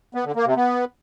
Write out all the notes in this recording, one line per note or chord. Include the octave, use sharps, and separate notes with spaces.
B3
D3
A#3
C3
B3